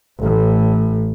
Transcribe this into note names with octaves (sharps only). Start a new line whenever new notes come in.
A1 A2